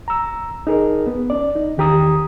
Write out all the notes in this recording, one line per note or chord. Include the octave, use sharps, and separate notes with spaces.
A#5 E6
D#4 G#4 A#4
B3
C#4 D5
D#4
E2 D#3 G4 A#5 D#6